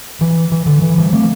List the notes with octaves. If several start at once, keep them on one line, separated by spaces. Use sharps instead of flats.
E3
E3
D3
E3
E3 G3
A3 C4